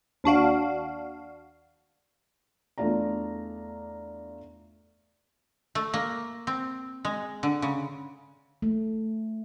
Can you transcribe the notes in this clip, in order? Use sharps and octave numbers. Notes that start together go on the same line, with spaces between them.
D#2 D4 F#4 F5
E2 A3 D4 F4 D5 A#5
A3
A#3
C4
G#3
D3
C#3
A3